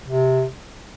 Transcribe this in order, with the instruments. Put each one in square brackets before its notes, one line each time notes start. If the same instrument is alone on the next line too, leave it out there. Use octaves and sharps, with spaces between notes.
[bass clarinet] C3